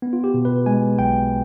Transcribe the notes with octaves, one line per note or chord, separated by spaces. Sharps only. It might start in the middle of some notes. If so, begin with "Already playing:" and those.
B3
F4
G4
B2
B4
G#3 G#5
B1 G5